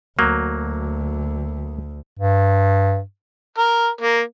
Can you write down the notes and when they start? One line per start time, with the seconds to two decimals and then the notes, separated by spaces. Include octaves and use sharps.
0.19 D2 F#3 A#3
2.19 G2
3.58 A#4
4.01 A#3